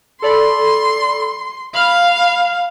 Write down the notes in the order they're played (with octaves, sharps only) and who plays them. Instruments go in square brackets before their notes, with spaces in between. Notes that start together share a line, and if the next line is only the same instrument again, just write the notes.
[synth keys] A4 D5 B5 [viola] C6
[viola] F5 [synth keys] B5 F6